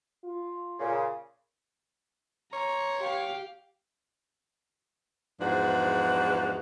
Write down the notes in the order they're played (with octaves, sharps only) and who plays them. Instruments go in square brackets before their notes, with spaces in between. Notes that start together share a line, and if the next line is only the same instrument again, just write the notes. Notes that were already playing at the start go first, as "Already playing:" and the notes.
[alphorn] F4
[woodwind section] A#2 C#3
[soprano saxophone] C#5 [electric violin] A#5
[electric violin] G4 F5
[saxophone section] E2 G#2 F3 D4 F#4 B4